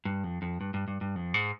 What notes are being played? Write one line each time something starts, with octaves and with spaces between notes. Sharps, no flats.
G2
F2
F2
G2
G2
G2
G2
F2
G#2